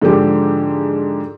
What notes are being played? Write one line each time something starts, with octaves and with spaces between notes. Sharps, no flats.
G#2 D3 F3 G#3 G4